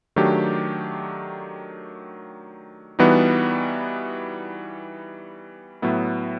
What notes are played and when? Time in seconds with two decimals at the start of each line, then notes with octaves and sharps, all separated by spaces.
0.16 D#3 F#3 A3 D4 G4
2.99 E3 G3 B3 D#4 F#4
5.82 A2 F#3 B3 E4